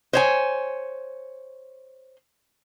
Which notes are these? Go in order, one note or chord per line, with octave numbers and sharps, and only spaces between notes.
C5 C#5 G#5